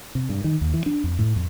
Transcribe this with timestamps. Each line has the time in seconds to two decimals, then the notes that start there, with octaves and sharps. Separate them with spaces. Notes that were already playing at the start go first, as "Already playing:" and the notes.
0.15 C3
0.29 G2
0.44 D#3
0.61 D#2
0.74 E3
0.86 D4
1.04 F2
1.19 A2
1.36 F2